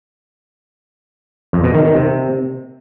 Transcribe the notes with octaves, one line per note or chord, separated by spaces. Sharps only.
F2
B2
D#3
D#3
C3